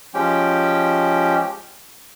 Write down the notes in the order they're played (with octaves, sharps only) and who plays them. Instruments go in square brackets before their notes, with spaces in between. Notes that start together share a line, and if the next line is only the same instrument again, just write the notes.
[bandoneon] F3 G#3 C#4 G4 G5